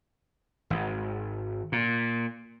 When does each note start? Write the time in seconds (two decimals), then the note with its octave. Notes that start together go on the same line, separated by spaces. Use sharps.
0.70 G#1
1.72 A#2